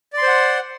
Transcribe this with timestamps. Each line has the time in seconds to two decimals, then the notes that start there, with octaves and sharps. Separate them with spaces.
0.13 D5
0.18 C6
0.22 C5
0.27 F#5